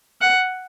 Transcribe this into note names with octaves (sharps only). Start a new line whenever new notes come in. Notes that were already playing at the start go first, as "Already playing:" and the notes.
F#5